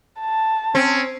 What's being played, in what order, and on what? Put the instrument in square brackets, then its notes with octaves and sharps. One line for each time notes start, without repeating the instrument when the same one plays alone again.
[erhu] A5
[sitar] C4 [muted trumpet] C#4